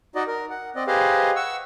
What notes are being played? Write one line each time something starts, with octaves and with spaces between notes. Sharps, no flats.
D#4 F#4 D5 D#5
A#4
F#5
C4 D5 D#5
G4 G#4 B4 C5 D#5 F5
F#5 C#6 E6